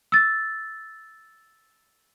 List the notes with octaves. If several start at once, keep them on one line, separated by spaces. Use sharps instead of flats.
E6 A6